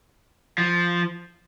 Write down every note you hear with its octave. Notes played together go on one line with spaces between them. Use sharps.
F3